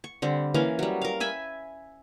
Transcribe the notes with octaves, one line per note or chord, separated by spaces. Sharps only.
C#6
D3 G3 C4
E3 A#3 C#4 F5
F#3 G3
A#4 F5
E5 G#5 B5